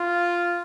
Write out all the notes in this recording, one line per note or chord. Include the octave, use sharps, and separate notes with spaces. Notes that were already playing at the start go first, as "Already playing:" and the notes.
Already playing: F4